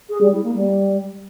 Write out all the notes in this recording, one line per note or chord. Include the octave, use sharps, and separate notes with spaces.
G#4
G3
E4
A#3
G3